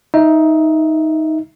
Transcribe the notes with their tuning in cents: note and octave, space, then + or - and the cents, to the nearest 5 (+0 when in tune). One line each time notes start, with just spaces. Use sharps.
D#4 +10 E5 +0